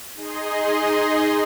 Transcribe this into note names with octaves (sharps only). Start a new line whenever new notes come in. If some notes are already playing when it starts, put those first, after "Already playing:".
D#4 G#4 D#5 C6